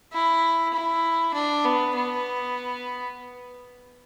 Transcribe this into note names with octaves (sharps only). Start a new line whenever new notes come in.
E4
E4
D4
B3
B3